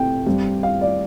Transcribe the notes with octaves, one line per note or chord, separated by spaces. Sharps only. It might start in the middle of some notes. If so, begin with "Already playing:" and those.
Already playing: C3 A3 C4 G5
G2 G3 C4
F5
D5